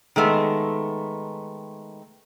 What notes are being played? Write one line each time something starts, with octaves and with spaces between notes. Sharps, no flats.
D#3 G#3 A3 B3